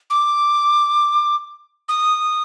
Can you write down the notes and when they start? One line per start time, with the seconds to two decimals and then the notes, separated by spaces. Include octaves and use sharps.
0.10 D6
1.89 D#6